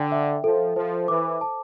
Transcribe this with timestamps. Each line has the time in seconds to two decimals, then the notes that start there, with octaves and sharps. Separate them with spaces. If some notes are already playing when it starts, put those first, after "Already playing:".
Already playing: D3 G5
0.12 E5
0.44 F3 A4
0.76 F3 C5
1.08 E3 D6
1.41 A5